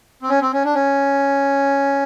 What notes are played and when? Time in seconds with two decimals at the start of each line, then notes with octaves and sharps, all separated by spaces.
0.22 C4
0.29 C#4
0.41 C4
0.53 C#4
0.64 D4
0.75 C#4